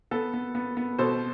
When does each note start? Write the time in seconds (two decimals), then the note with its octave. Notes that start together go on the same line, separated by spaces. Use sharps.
0.11 B3 A4
0.34 B3
0.55 B3
0.77 B3
0.99 B2 A4 C5